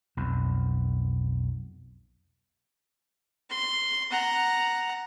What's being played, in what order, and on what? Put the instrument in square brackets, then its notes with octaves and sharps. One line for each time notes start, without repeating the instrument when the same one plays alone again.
[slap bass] B1 F2
[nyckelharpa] C6
F#5 A#5